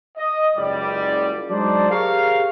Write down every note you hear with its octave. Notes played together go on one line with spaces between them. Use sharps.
D#5
F#1 C#2 G3 D5
F#3 G#3 D4 D#4 C5 D5
G4 G#4 A#4 C5 C#5 F5